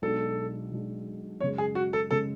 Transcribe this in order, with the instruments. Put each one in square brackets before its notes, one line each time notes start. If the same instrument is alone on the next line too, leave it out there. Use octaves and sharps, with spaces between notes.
[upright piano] B1 B2 G#3 D4 [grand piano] A4
[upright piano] B1 B2 G#3 D4
[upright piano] F#2 C#3 G#3 [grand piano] C#5
[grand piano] G#4
F#4
A4
[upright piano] C#3 G#3 [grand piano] A4